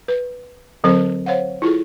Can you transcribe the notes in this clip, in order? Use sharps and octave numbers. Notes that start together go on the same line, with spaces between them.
B4
D3 F#3 C4 A4 C5
C5 C#5 F5 F#5
E4 F4 G#4 A4